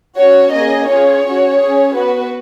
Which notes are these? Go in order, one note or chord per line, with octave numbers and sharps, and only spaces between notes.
C#4 F#4 C#5
A#3 C#4 G#4 D#5
C#4 F4 G#4 C#5
C#4 F#4
C#4 G#4
B3 F#4 B4